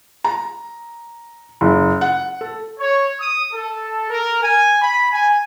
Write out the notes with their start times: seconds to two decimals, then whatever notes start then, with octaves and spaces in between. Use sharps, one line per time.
0.24 A#5
1.61 F#1
2.01 F#5
2.41 A4
2.79 C#5
3.20 D#6
3.53 A4
4.10 A#4
4.42 G#5
4.82 B5
5.12 G#5